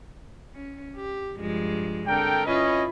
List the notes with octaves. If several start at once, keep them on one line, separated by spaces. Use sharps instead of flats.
C#4
G4
G2 F3 G#3
D3 C4 A4 A#4 G5
C#4 E4 F4 B4 D#5